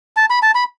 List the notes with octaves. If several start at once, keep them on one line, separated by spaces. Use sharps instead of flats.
A5
B5
A5
B5